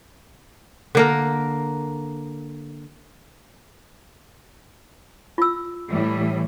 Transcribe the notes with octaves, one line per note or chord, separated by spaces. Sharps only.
D3 A#3 A#4
F4 E6
A2 E3 G3